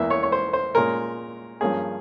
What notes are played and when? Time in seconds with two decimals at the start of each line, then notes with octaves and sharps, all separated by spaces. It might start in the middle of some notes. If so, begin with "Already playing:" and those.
Already playing: E2 E3 A#3 E5
0.10 C#5
0.23 C#5
0.32 C5
0.53 C5
0.75 A#2 G#3 C#4 A#4
1.61 G2 F3 A#3 C#4 G#4